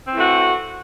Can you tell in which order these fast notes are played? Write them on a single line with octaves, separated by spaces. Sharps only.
C4 E3 A3 F#4